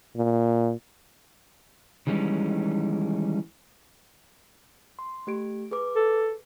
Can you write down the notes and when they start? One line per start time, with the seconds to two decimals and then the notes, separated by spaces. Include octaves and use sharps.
0.16 A#2
2.07 D#3 E3 G3 G#3 C#4 D#4
4.99 C6
5.27 A3 G4 D7
5.71 G#4 B4 D6
5.96 A4